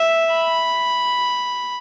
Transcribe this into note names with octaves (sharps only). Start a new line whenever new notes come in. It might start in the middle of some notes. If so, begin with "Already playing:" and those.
Already playing: E5
B5